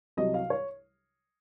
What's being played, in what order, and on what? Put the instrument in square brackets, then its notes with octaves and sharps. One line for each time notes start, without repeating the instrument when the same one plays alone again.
[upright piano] C2 C3 F#3 D#5
F5
C#5